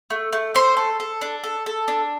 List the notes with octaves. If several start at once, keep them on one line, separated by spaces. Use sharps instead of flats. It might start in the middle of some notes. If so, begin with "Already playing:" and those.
A3
A3
A3 C5 C6
A4
A4
D4
A4
A4
D4